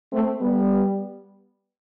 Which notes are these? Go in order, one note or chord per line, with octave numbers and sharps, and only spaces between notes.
A3 C4
G3 B3